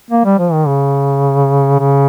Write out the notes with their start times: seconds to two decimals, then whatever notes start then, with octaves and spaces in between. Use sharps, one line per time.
0.10 A#3
0.25 G3
0.39 F3
0.53 D#3
0.67 C#3
1.79 C#3